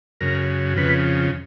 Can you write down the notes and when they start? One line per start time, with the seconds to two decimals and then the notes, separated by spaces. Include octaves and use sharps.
0.21 F#2 C#3 A#4
0.76 F2 C#3 B4